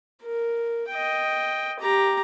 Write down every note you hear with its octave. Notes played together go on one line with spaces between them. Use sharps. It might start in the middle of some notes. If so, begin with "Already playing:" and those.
A#4
D#5 G5
G4 A#5